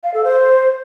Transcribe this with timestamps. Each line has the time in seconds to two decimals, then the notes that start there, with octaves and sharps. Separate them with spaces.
0.03 F5
0.14 A4
0.24 C5